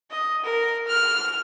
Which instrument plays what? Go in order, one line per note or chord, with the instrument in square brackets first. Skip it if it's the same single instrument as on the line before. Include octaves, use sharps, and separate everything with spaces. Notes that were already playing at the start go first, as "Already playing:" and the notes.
[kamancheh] D#5
A#4
F6